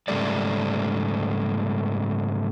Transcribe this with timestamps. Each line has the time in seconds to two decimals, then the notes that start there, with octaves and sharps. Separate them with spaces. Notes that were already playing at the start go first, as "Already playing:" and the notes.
0.08 G#2 C#3 F3 G3 A3 D5